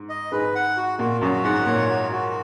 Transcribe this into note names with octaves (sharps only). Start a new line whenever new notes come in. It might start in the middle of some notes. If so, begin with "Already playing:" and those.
Already playing: G#2
D#5
G#2 G#3 B4
F#5
F#4
A#2 A#3 F#4
F#2 F#3 F#4
G#2 G#3 F#5
A#2 A#3 C#5
F#4
F#4